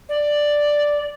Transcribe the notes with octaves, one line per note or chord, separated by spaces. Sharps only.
D5